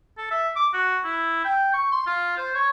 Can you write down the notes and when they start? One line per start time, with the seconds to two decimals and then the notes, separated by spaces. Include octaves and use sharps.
0.17 A4
0.31 E5
0.56 D6
0.73 F#4
1.05 E4
1.45 G5
1.74 C#6
1.92 C6
2.07 F4
2.37 C5
2.55 C#5